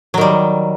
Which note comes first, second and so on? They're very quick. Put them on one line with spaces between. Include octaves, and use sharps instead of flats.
F#3 D#3 G3